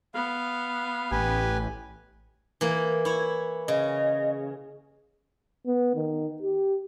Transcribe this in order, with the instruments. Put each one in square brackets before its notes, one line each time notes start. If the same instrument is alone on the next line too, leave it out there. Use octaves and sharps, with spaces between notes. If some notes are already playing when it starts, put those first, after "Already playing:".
[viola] B3 [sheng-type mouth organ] F5
[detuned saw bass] A1 [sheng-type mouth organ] G4 B4 G#5
[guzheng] E3 A#3
E4 C#5
[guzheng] C#3 [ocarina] D#5
[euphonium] B3
D#3
G4